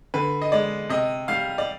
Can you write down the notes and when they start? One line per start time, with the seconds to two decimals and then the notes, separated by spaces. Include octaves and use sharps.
0.14 D3 B4
0.42 D#5
0.52 G#3 D5
0.89 C3 D#5
1.28 G3 F5
1.58 D5